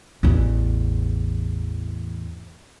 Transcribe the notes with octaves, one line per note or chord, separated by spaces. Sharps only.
A1 E2